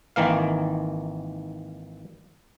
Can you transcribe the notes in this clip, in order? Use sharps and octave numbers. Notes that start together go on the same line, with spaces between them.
G#1 D#3 E3 A#3 F5